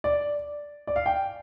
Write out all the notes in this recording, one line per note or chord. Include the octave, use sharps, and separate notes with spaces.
D5
D5
F5
G5